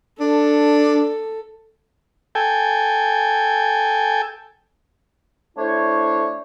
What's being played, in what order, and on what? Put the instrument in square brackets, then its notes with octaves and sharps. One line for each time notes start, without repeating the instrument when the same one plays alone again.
[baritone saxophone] D4 [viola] A4
[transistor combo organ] A4 G5 G#5
[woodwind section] A3 D4 E4 C5 C#5